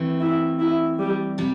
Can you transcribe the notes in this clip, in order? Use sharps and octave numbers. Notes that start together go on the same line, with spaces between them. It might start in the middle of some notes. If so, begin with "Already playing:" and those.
Already playing: E3 A3 C4
E4
E4
G3
C3 G3